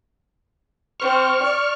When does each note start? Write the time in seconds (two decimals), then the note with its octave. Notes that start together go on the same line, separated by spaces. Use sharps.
1.00 C4 C#6 F6
1.41 D5